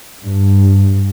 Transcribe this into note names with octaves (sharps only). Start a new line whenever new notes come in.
G2